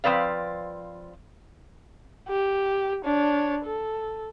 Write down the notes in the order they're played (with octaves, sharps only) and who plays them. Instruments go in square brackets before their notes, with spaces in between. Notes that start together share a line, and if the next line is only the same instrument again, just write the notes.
[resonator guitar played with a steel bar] F3 C4 B4 D5 F5
[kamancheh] G4
D4 C#5
A4